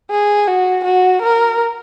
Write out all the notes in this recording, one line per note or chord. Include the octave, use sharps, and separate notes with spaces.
G#4
F#4
F#4
A#4